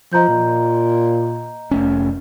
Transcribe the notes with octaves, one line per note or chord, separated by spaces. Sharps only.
F3 D#5 A#5 G6
A#2
F1 A3 C#4